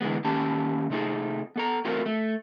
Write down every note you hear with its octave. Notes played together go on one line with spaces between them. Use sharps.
D3 E3 G#3 B3
D#3 A#3 C#4 G4 A5
C3 A3 D#4 F4 G#4
B3 A4 A#5
A3 C4 F4 F#4 A#4
A3